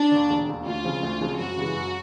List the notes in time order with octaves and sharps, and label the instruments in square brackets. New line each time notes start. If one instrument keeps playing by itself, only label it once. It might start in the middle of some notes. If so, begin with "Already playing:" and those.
Already playing: [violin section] D4
[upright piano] D#2 D3
E1
D#2 D3
[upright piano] D2 [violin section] F4
[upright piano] C#3 F3 G#3 C4
D2
C#3 F3 G#3 C4
[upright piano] F#2 [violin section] F#4
[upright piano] C#3 E3 G#3
F#2